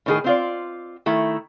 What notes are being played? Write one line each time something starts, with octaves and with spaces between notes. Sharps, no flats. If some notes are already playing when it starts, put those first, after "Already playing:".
A2 D#3 G#4
C4 F4 D5
D#3 A3 E4